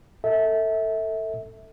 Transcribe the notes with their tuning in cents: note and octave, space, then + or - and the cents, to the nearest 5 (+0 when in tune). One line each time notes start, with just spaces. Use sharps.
A4 +25 E5 -25